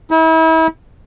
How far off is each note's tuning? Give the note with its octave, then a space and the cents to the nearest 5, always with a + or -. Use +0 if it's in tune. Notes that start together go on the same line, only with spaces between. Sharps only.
E4 -35